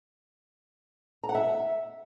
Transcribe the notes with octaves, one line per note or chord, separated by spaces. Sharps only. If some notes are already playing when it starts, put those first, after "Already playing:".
A#5
F#5
E5